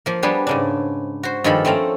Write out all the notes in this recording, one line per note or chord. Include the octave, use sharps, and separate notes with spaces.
F3 A#3
G3 B3 D4 G4 G#4
G#2 C#3 D4
F#4 C5
G2 D#3 F3 G#3 A4 B5
A3 C4 C#4 A4 A#5